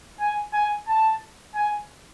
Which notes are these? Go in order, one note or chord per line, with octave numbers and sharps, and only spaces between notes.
G#5
G#5
A5
G#5